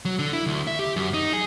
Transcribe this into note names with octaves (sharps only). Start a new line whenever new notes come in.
F#3
D3
E4
D2
E5
G4
F#2
D#4
G#4